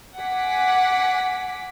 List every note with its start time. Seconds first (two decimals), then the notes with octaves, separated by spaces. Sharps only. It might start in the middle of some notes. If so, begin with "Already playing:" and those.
0.18 F#5 G#5 D6 B6